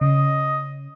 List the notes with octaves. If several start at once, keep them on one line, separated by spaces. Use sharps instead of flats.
C#3 D#5